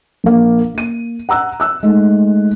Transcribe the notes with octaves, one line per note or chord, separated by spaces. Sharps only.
A#1 A#3
A#3 D#7
F#5 A#5 E6 F#6
E6 F#6
G#3 A3 D#4